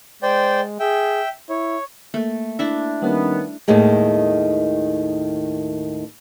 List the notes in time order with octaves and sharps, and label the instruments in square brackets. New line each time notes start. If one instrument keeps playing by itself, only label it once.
[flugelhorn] G#3 [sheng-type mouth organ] C5 D5 G5
[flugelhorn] G#4 [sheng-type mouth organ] E5 G5
[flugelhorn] E4 [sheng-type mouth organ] C#5
[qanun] A3 [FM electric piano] A#3
[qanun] D4 E4 E5
[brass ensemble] D#3 B3 [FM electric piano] G3 A#3 C#4
[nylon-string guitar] D#2 A2 D#3 G#3